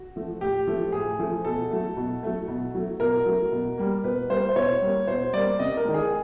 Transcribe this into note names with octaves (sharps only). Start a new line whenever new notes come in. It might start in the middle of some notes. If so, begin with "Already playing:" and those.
Already playing: F#4
F3 A3
A2 G4
F3 A3
A2 G#4
F3 A3
B2 A4
F#3 A3
B2
F#3 A3
B2
F#3 A3
B2 A#4
F#3 A3
B2
G3 A#3
B2 B4
G3 A#3 C5
C5
B2 C#5
G3 A#3
B2 C5
G3 A#3 D5
C3 D#5
A#4
D#3 G#3
G#4